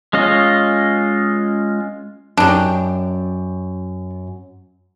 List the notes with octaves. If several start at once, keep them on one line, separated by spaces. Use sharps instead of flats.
G#3 C#4 F4 D#5
F#2 D4 D#4 G4